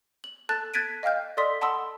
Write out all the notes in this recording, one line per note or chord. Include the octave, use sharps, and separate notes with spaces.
F#7
A4 A5 F#6 A6
F#6 G#6 A6 B6 D7 D#7
D#5 F5 G5 F6 G6
A4 D5 D#5 C6 D#6 B6
F#5 A5 B5 C6 D#6 E6